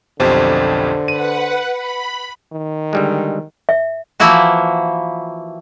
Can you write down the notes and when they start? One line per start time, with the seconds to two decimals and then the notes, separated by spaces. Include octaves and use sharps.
0.20 B1 F2 D3 G4 C5
1.08 B4 F#5 D#7
1.72 B5
2.53 D#3
2.93 D3 G3 G#3
3.69 E5
4.20 E3 F3 A#3 E4 F#4 B4